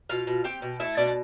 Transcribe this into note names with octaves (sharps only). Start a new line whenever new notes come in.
B2 F4 F5
B2
C4 G4 G5
B2
A3 E4 E5
B2 D4 D5